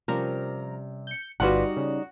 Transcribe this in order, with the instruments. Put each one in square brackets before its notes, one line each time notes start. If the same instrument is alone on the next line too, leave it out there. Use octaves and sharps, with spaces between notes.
[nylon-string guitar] C3 G3 C#4 [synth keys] F3 A#4 A#5
[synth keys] G6 C#7
[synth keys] G1 F4 B4 [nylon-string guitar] G3 D#4 D5 [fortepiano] F#4 F#5
[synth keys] C#3